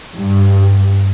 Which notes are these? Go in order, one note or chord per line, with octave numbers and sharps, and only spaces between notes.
G2